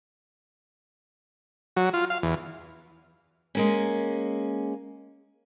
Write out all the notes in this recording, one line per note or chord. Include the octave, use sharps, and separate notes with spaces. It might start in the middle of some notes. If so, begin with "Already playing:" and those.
F#3
F4
F5
E2
G#3 A#3 C#4